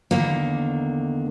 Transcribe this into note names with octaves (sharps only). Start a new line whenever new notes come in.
E2 D3 D#3 A#3